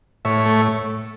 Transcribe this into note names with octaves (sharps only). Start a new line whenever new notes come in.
A2 C#5 E5
A3